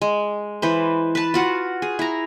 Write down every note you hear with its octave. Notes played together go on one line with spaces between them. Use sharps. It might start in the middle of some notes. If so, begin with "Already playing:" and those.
G#3
E3 B4 C5
B4 A5
F4 F#4 F#5
G#4
E4 A#5